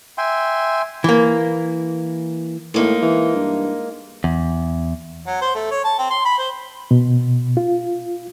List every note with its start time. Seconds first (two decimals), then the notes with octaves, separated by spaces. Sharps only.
0.18 E5 G5 G#5 C6
1.04 E3 A#3
2.74 A2 G#3 A#3 D#4
3.02 E3
3.36 G2
4.24 E2
5.27 F#3
5.41 C5
5.55 A3
5.71 C#5
5.84 A5
5.99 C4
6.10 C6
6.25 B5
6.38 C5
6.91 B2
7.57 F4